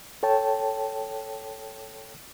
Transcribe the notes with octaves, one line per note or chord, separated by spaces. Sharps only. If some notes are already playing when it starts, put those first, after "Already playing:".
A4 C#5 G5 A5